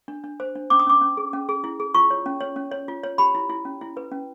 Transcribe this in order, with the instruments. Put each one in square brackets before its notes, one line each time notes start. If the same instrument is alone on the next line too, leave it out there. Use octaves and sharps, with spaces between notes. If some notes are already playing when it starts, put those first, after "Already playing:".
[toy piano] D4
D4
C5
D4
C#4 D6
D#6
C#4 D6
C#4
G#4
C#4
G#4
E4
G#4
F4 C#6
C#5
C#4
C#5
C#4
C#5
F4
C#5
G4 B5
E4
E4
C#4
E4
B4
C#4